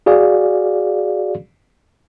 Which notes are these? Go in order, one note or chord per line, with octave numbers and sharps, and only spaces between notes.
F#4 G#4 D5 F5